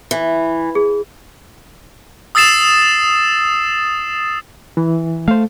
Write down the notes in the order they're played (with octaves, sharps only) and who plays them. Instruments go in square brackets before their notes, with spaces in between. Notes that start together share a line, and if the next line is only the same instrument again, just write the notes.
[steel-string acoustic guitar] E3
[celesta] G#4
[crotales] D#6 E6 A6 C7 E7
[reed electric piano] E3
[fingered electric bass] A3 [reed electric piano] C5 F5